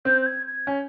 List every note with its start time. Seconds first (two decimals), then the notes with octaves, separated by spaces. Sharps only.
0.05 C4 G6
0.21 G6
0.26 G#6
0.47 G#6
0.67 C#4